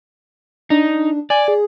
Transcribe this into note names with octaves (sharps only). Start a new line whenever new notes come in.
D4 D#4
D5 G#5
G#4